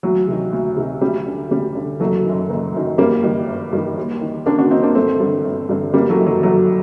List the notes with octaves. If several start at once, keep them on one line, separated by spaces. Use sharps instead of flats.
D2 F#3
C3 D#3
D2
C3 D#3
D2 G3
D3
D2 G3
D3
F#1 F#3 A3
F#2 D#3
F#1
F#2 D#3
G1 G3 A#3
G2 D#3
G1
G2 D#3
D#2
D#3
D#2 A#3 D4
D4 F#4
D#3 C4 D#4
A#3 D4
G1 A3 C4
G2 D3
G1
G2 D3
G1 G3 A#3
F#3 A3
F#2 D#3
F#3
G1 F#3 A3